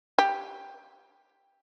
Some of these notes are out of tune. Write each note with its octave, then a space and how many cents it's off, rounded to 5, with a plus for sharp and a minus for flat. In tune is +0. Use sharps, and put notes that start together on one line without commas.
G4 +5